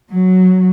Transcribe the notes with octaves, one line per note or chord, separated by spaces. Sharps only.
F#3